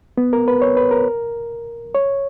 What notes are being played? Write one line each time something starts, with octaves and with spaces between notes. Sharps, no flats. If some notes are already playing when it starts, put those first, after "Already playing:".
B3
A#4
B4
C#5
B4
A#4
C#5